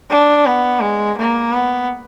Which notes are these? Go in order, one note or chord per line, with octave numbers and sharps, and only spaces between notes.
D4
B3
G#3
A#3
B3